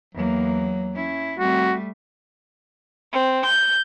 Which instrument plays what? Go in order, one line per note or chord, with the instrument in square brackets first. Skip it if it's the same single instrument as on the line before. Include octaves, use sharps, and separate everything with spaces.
[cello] E2 A#3 [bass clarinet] F#3
[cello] C#4 E4
[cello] G3 A3 [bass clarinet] C4 [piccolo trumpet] F#4
[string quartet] C4
G6